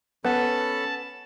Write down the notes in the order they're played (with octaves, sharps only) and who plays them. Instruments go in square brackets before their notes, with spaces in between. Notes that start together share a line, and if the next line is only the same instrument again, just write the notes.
[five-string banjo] B3 [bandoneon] C#4 A4 B5 [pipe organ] A5